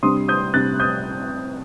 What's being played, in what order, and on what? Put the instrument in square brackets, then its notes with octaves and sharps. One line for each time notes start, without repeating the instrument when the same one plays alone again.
[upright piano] C3 G3 D4 C6 D#6
D#6 G6
C3 G3 D4 F#6 A6
D#6 G6